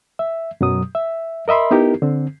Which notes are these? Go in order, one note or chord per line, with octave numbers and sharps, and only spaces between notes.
E5
F#2 B2 F#3 D#6
E5
A#4 D#5 E5 B5 C6
B3 D#4 E4 G4 A#4
D3 C4